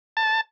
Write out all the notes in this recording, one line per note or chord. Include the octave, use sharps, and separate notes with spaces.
A5